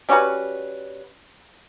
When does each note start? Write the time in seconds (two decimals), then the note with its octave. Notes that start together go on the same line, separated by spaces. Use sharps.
0.09 G3 C#4 F#4 B4